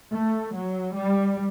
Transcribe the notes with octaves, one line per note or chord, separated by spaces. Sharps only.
A3
F#3
G3